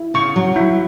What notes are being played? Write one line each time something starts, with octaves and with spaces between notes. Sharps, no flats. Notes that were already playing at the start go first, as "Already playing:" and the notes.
Already playing: E4
C#3 C#6
F#3
E4